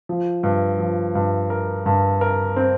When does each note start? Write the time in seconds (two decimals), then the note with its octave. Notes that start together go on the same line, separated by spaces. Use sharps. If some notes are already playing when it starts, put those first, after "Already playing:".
0.09 F3
0.43 G2
0.79 F3
1.15 G2
1.50 A#4
1.86 G2
2.21 A#4
2.56 C4